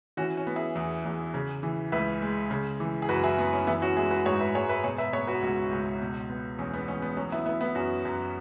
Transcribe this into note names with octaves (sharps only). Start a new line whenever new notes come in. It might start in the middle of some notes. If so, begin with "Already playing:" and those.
E3 C#4 F#4
C#4
B3
E4 G#4
E2
E2
C#3
E3
C#2 B4 E5
G#3
C#3
E3
G#4
F#2 F#4 B4
E4 G#4
F#2 B3
C#4
E3 B3 E4
C#4 F#4
G#3 E4 G#4
F#4 B4
G#2 G#4 C#5
B4 E5
G#2 G#4 C#5
B4 E5
B2 G#4 C#5
B4 E5
B3 G#4 C#5
F#4 B4
C#2 C#4 F#4
C#2
B2
B3
E2 C#4
B3
E2 C#4
B3
F#3 C#4
B3 E4
B3 E4
B3 E4
F#2 C#4 F#4
F#2